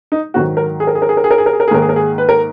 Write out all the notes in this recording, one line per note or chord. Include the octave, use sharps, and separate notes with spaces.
D#4
G#2 D#3 F#3 F#4
A#4
G#4
A#4
G#4
A#4
G#4
A#4
G#4
A#4
G#4
A#4
G#4
A#4
G#4
G#2 D#3 A#3 A#4
G#4
A#4
G#4
B4
A#4